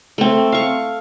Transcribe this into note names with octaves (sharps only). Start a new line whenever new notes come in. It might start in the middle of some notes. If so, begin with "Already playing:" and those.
A3 C4
F5 C#6